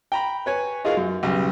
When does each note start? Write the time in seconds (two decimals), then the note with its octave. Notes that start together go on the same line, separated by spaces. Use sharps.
0.12 G5 A#5 B5
0.46 B4 C#5 G#5
0.84 D#4 F4 F#4 G#4 A#4 F5
0.97 F#2
1.23 B1 C#3 G3